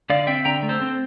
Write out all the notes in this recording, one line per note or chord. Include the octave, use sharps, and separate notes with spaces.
D3 D5 F5
C4 E5 G5
D3 G5 A#5
A3
A4 C5
C4